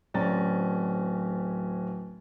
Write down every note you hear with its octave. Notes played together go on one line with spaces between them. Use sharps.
D1 C4 C#4 D5 A#5 A6